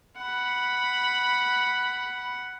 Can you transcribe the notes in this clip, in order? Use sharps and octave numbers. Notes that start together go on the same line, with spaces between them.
F#5 B5